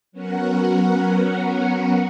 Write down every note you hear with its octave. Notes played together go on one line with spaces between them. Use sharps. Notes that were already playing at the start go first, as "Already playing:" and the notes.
F#3 B3 C#4 F#4 A#4 F#5